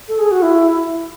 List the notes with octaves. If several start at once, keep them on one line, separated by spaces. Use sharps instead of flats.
A4
G#4
F#4
E4